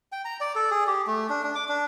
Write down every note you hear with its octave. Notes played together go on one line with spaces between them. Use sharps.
G5
A#5
D5
A4
G#4
G4
A3
D4
D4
D6
D4